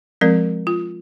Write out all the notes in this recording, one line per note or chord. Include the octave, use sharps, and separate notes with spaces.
F3 G#3 C4 A#4
F4